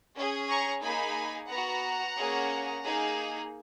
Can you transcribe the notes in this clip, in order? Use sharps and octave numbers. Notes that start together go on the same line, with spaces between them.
C#4 G#4
A#5 C#6
A#3 D#4 G#4 G#5 B5
B3 F#4 F#5 A#5
A#3 C#4 G#4
A#3 D#4 G#4